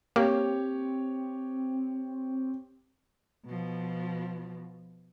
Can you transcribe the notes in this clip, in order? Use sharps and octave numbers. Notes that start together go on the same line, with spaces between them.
A#3 C4 G4 C#5
B2 F3